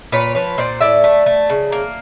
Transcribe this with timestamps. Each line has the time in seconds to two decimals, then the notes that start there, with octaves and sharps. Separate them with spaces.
0.12 A#2 B4 C#5
0.35 F3 B4 C#5
0.58 A#2 C5 D5
0.81 A2 D5 E5
1.04 A3
1.26 A3
1.49 C#3
1.72 A#3